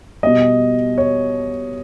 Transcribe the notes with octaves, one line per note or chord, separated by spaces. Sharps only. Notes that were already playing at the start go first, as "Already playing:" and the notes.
B2 G3 D#5
C#5